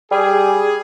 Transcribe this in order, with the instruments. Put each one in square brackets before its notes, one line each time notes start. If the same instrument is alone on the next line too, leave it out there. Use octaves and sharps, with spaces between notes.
[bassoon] G3 [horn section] G#4